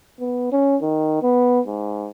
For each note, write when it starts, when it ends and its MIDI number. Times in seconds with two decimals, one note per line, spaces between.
0.20 0.50 59
0.52 0.77 61
0.82 1.20 51
1.23 1.60 59
1.67 2.09 44